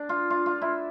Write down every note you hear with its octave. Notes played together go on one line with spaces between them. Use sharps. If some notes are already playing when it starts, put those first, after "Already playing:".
Already playing: D4
F4
F4
F4
E4